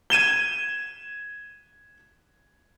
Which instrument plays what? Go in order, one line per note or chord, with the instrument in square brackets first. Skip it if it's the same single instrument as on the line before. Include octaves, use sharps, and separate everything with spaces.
[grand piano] G#6 D#7 E7 G7